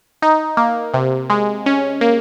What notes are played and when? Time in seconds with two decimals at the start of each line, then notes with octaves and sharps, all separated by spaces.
0.22 D#4
0.57 A#3
0.94 C3
1.30 G#3
1.66 C#4
2.01 A#3